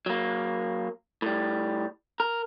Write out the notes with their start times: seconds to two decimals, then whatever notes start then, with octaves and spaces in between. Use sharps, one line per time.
0.06 F#3 A#3
1.22 A2 G3
2.20 A#4